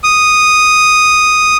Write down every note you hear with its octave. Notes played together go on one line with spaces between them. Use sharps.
D#6